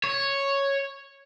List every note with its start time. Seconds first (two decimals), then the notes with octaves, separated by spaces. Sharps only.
0.04 C#5